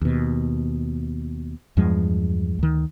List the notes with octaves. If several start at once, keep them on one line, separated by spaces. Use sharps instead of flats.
D#2 B2
E2 G2 F3 G#3
D2 D#3